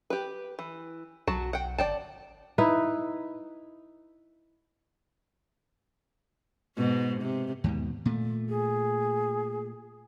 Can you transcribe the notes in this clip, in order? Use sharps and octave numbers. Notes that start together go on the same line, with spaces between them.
G4 B4
E3
B1 F#3 F#4 A5
F#5 G5
G1 D5 G5 A5
D#4 E4 B4
G#2 B2
C3
D#2 G#2 B2
A#2 A3
G#4